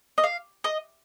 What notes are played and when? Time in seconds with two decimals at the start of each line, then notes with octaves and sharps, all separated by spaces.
0.18 D#5
0.24 F5
0.64 D#5